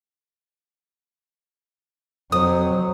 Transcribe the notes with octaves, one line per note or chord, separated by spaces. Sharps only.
F2 F#3 C5 D#6